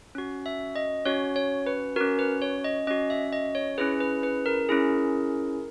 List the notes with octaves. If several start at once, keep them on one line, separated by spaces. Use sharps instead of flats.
C#4 F#4
E5
D#5
C#4 F#4 C#5
C#5
B4
C#4 F#4 A#4
B4
C#5
D#5
C#4 F#4 D#5
E5
D#5
C#5
C#4 E4 G#4 B4
B4
B4
A#4
C#4 E4 G#4